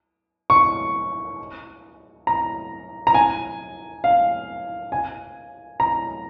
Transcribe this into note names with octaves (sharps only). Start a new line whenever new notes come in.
C#6
A#5
A#5
G#5
F5
G#5
A#5